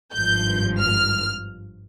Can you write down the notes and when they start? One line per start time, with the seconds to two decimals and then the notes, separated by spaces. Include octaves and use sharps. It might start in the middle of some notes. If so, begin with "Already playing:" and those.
0.13 G#1 G2 F3 G6
0.79 F6